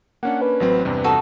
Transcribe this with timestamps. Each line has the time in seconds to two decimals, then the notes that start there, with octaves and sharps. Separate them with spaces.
0.23 A#3 C#4 D4 F#5
0.41 B4
0.60 A1 F#3 C4
0.85 E2 G2 C3
1.04 D#4 F#4 A4